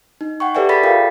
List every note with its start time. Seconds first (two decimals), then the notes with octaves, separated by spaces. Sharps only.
0.21 D#4
0.40 F#5 G5 C#6
0.55 G4 A4 B4 D5 E5 G#5
0.69 G#4 A4 D5 B5 A6 B6
0.83 F4 A#4 F5 G5